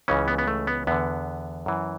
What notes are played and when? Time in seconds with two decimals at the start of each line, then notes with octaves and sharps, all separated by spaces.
0.08 C#2 C#3 E3 C#4
0.28 B3
0.38 B3
0.48 A3
0.67 B3
0.87 E2 D3 B3
1.66 F#2 E3